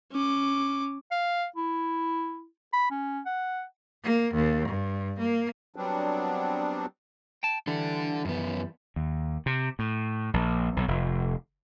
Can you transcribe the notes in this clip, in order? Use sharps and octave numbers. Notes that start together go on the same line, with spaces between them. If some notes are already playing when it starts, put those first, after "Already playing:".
C#4 D6
F5
E4
B5
C#4
F#5
A#3
D#2
G2
A#3
F#3 G3 B3 C4 D4
G5 A5
E3 G3 D4 A4
F#2 B3
D#2
C3
A2
A#1
B1
F1